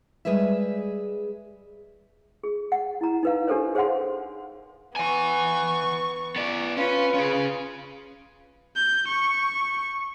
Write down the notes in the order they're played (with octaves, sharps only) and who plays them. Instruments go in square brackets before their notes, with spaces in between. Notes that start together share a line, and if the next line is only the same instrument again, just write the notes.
[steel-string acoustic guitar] G3 G#3 G#4 B4 E5
[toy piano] G#4
F#5
E4 A#5
D#4 B4 F5
D4 G4 A4 A#4 C5 C#5
G#4 C5 C#5 F5 F#5 C6
[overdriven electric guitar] E3 G#5 [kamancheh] B3 C#6
[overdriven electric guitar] B3 D5
[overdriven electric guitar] C#4 C#5 [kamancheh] F4 B4
[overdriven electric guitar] C#4 G#4
[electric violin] G6
C#6